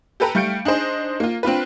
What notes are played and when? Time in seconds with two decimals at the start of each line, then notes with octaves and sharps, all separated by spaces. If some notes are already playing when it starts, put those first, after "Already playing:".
0.20 G4 A4 B4 G5 A#5
0.35 G3 A3 F5 G6 C#7 D7
0.65 D4 D#4 G#4 C5 D#5
1.20 A#3 F4
1.43 C4 D4 F4 B4